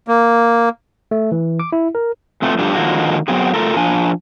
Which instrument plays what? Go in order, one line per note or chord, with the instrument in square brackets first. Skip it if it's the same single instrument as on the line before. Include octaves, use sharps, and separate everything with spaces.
[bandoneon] A#3
[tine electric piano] A3
E3
D6
E4
A#4
[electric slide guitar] F2 C3 F3 A3 B3
F3 G3 A3 D4 G4 A4
D3 D#3 F3 G#3 A#3 F#4
F#3 B3 C4 G#4
A3 F4 A4 A#4
F3 D4 G#5